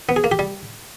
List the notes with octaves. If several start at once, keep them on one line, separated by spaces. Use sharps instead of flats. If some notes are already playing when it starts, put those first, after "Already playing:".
B3
G#4
A#3
G4
G3